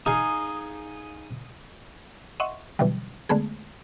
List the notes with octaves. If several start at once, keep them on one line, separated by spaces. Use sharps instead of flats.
D#4 G#4 F5 D#6
D#5 E5 F#5 C6 C#6
B2 D3 E3 F#3 G3
D3 G#3 A3 B3 G#4